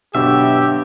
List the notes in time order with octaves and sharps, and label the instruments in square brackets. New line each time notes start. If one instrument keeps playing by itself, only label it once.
[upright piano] G2 D3 F#3 [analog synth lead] B2 [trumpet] G4 [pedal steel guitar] E5